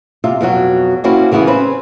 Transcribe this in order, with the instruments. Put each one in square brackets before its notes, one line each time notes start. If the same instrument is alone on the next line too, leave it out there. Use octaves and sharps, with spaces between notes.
[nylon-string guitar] C3 F4 E5
F2 B2 F#3 F#4
A#3 C4 C#4 E4 F#4
C#3 E3 B3 E4 G#4
C4 C#4 B4